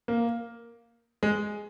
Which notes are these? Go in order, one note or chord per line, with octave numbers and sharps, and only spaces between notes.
A#3
G#3